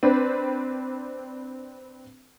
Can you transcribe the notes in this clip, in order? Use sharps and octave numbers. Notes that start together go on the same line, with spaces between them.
C4 D4 B4 C5